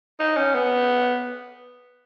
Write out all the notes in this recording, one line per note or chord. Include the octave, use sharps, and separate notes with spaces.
D#4
C#4
B3